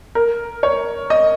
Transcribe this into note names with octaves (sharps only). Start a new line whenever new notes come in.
A#4
C#5
D#5